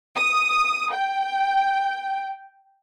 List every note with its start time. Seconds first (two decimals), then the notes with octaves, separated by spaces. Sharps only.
0.16 D#6
0.92 G5